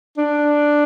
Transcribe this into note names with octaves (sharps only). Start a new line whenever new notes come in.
D4